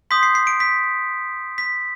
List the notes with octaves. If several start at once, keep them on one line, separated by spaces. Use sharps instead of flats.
C6 D#6 G6 B6
C7
C7
D7
B6
B6